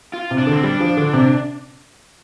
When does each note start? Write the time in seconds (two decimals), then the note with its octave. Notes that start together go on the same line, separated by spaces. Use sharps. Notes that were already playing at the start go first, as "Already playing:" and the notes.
0.14 F4
0.31 C3
0.38 D4
0.47 D3
0.52 C4
0.63 G3 D4
0.80 F3
0.97 D3
1.13 C3